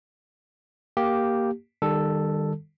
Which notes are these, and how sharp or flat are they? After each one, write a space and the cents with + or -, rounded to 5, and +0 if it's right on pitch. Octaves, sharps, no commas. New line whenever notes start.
A#3 +0 G4 +0
D#3 -20 G3 +30 A4 +0